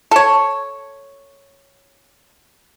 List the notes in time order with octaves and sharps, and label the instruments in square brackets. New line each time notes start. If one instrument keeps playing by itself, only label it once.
[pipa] A4 C#5